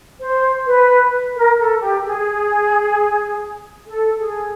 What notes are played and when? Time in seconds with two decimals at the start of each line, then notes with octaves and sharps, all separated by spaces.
0.20 C5
0.66 B4
1.35 A#4
1.58 A4
1.80 G4
2.04 G#4
3.88 A4
4.19 G#4